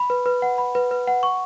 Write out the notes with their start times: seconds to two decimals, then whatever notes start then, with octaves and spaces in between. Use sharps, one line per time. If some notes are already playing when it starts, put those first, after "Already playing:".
Already playing: B5
0.10 B4
0.26 B4
0.42 F#5
0.58 B5
0.75 B4
0.91 B4
1.07 F#5
1.23 C#6